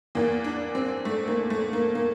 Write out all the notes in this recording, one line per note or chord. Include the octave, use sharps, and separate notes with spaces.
E2 E3 A#3
D4
C4
A3
A#3
A3
A#3
A#3